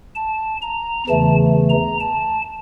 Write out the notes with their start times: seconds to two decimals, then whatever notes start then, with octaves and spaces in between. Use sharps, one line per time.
0.15 A5
0.62 A#5
1.07 E2 C#3 E3 A3 A5
1.70 A#5
2.00 A5